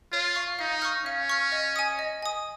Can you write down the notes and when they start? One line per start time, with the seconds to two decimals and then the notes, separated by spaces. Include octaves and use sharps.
0.12 F4 C#5
0.36 F5 C#6
0.59 D#4 F5
0.82 C#6 F6
1.05 C#4 F5
1.29 C#6 F6
1.52 D#5
1.76 G#5 D#6
1.99 D#5
2.22 G#5 D#6